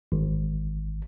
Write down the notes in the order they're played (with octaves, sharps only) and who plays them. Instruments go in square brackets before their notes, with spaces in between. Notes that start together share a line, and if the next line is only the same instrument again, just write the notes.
[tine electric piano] G#1